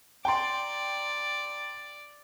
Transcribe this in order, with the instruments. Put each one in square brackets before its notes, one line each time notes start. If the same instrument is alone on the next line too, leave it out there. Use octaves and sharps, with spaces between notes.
[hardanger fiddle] D5 [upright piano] G5 A#5 C6